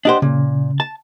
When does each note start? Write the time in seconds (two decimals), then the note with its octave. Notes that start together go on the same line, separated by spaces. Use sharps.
0.05 D4 G4 C5 D#5 F#5
0.22 A#2 C#3
0.80 A5